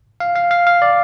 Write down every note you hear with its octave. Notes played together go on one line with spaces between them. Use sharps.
F5
F5
F5
F5
D5